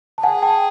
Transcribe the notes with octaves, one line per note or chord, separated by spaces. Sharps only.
A5
G#4 F#5 G#5
G5 A5